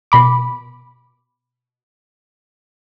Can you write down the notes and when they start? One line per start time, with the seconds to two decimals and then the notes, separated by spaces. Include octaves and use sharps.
0.12 B2 B5 D6